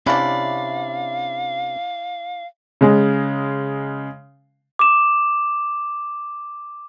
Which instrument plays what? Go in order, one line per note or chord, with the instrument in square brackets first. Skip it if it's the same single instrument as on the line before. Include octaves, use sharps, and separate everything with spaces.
[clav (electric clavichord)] C3 C#4 D4 [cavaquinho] E4 D5 [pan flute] F5
[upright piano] C#3 G#3
[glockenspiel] D6 E7